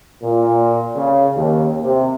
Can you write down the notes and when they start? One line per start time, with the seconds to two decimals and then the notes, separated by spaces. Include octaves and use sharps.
0.22 A#2
0.95 C#3
1.36 D#2
1.83 C3